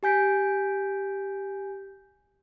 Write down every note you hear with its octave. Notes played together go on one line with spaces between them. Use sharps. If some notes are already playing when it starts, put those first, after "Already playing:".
G4 G#5 G6 B6 D7